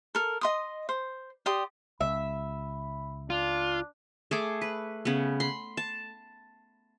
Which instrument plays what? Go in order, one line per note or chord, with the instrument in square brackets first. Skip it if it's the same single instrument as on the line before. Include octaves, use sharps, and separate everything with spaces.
[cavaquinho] A4 A#4
D#5 C6 D#6
C5
G4 D5 C6 D#6
[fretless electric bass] C#2 [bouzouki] E5 [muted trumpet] B5
[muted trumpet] D4 [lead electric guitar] F4
[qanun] A3 G#4 D6
B4
C#3 B3
B5 C6
A5